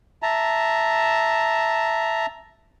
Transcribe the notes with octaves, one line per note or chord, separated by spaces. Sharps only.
E5 A5 A#5